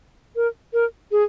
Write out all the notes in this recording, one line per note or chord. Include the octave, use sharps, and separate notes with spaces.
A#4
A#4
G#4